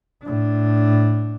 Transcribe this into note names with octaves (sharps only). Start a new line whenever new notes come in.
A2 D4